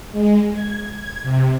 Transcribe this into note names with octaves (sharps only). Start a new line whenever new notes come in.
G#3
G#6
G#6
C3